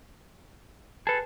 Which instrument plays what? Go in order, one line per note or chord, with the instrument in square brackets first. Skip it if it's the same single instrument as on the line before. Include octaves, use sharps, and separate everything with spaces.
[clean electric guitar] G#4 A4 [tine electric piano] B4 A5